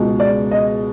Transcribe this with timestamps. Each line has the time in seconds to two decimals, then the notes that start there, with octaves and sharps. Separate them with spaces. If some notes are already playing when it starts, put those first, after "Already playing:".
Already playing: C#2 B2 G#3
0.20 D5
0.51 D#5